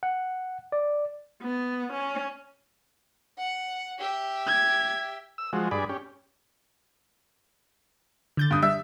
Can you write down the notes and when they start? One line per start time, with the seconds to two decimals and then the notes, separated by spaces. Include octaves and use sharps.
0.03 F#5
0.72 D5
1.43 B3
1.92 C#4
3.38 F#5
3.99 G4 E5
4.47 G#6
5.38 E6
5.53 F3 G#3 F#4
5.71 G2 G#4 D5 B5
5.89 C#4 G4
8.37 D3 G6 A6
8.51 G2 D#6
8.62 G3 E5 E6